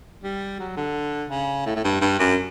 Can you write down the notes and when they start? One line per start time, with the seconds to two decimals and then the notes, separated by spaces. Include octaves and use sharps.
0.23 G3
0.59 F#3
0.77 D3
1.30 C#3
1.66 A2
1.76 A2
1.84 G2
2.01 G2
2.19 F#2